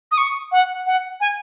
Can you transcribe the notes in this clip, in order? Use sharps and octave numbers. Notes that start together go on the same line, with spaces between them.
D#6
C#6
F#5
F#5
G#5